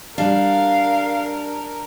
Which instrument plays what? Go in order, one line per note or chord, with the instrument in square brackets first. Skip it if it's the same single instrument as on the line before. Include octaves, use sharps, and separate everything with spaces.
[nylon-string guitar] G3 [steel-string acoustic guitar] D4 [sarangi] A#4 [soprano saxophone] F5